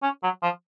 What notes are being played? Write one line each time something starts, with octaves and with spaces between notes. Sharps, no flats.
C#4
F#3
F3